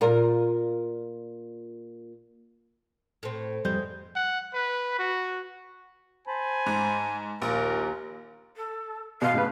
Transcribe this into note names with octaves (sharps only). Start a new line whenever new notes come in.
A#2 F4 A#4
A2 C4
F2 G#2 G3 C4 G6
F#5
B4
F#4
C5 G#5 A5 B5
G#2
A#1 D#2 A#3 A#4
A4
B2 F5
A2 C#3 B4